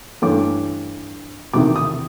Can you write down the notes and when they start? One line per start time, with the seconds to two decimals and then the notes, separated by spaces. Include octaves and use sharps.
0.22 G2 E3 A3 C#4 D6
1.54 E2 C3 D#3 D6
1.76 D#6